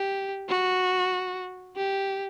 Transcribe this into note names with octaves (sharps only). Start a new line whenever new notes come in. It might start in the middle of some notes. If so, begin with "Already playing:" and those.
Already playing: G4
F#4
G4